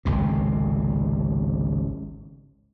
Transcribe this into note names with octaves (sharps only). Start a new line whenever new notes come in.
G#1 C#2 C3